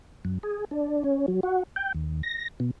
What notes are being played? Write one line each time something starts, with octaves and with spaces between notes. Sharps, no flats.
F#2
G#4
D4
C#4
F#3
F#4
G5
D#2
A#6
B2